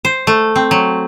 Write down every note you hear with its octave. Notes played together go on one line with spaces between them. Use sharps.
C5
A3
C4
F#3